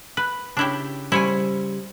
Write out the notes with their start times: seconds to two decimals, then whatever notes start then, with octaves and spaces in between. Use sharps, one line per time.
0.17 B4
0.57 C#3 D4 E4 G4
1.12 C#3 G3 E4 C5 C#5 G#5